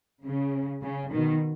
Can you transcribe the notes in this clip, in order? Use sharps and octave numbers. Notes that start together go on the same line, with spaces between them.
C#3
C#3
B2 D#3